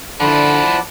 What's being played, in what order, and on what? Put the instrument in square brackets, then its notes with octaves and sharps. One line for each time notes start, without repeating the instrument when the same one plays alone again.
[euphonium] D3 [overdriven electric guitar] F3 E4 [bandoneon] D5 F#5 A5 [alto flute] B5